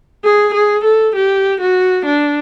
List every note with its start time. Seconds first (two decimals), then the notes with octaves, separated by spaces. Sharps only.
0.25 G#4
0.54 G#4
0.84 A4
1.16 G4
1.61 F#4
2.06 D4